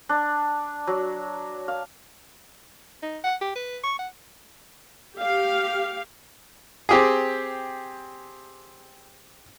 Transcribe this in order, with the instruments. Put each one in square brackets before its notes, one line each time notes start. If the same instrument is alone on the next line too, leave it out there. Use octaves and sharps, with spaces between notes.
[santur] D4
F#3
F5
[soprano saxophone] D#4
F#5
G4
B4
C#6
F#5
[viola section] G4 F5
[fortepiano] C4 G4 G#4